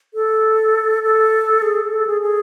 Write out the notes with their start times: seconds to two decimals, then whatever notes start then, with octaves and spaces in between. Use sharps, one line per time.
0.14 A4
1.03 A4
1.62 G#4
1.91 A4
2.07 G#4
2.22 G#4